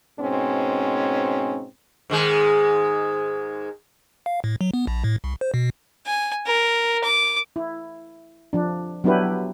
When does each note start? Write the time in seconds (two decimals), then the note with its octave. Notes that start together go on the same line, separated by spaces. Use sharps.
0.19 G#2 B2 C4 C#4
2.10 G#2 D#3 G#3
4.26 F5
4.44 A2
4.61 F#3
4.74 B3
4.87 A#1
5.04 A2
5.24 C2
5.41 C5
5.54 B2
6.06 G#5
6.46 A#4
7.04 D6
7.56 E4
8.53 F3 D4
9.04 F#3 B3 D4 E4 G4 B4